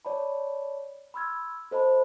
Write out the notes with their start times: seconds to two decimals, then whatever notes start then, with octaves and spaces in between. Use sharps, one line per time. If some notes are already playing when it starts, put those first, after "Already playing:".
0.05 C#5 D5 A5 B5
1.14 B5 C6 E6 F6 G#6
1.71 A4 C5 D#5 A5 B5